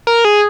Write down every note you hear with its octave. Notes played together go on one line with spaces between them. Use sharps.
A#4
G#4